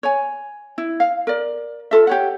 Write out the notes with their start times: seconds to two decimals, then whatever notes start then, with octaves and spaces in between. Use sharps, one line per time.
0.03 C#5 G#5
0.78 E4
1.00 F5
1.27 A#4 D5
1.91 F4 A4 E5
2.07 G4 C#5 F#5